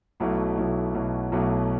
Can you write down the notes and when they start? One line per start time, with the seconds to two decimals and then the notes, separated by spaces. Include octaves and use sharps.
0.20 B1 B2 F#3 A3 E4
0.57 B1 B2 F#3 A3 E4
0.94 B1 B2 F#3 A3 E4
1.32 B1 B2 F#3 A3 E4